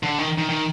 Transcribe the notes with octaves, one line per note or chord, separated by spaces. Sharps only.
D3
D#3
D#3
D#3